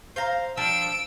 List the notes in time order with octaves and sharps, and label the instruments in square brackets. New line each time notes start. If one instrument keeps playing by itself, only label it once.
[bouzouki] C5 F5 A#5
[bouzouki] F3 G3 D4 [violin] E6 D7